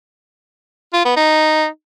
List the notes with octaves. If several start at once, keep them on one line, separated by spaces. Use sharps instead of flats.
F4
B3
D#4